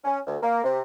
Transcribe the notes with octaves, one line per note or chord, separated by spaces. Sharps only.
C#4
D2
A#3
C3